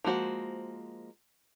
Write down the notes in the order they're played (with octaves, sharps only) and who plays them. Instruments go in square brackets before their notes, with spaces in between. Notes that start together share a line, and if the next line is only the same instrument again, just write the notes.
[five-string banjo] F3 G#3 A#3 F#4 C5